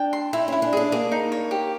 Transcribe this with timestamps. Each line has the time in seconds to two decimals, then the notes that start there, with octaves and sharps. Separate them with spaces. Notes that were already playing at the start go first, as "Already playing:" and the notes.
Already playing: D4 G5
0.13 C6
0.33 D#4 E4
0.48 C#4 E4
0.62 D4
0.73 D4 G#4
0.92 A#3 G#4
1.12 D#4
1.32 C#5
1.51 G4